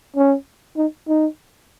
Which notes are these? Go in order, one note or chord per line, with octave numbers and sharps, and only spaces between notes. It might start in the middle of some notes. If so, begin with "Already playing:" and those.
C#4
D#4
D#4